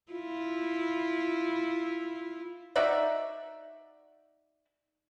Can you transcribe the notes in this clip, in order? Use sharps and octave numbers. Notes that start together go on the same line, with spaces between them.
E4 F4
D#4 F#4 D5 E5